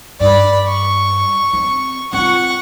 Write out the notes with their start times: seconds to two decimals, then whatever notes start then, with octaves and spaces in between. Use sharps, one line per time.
0.20 G2 D5 B5
0.68 C#6
1.53 C4
2.13 C4 F4 F#5 C#6